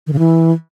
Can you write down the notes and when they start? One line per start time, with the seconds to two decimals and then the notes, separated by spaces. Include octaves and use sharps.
0.07 D#3
0.13 C#3
0.19 E3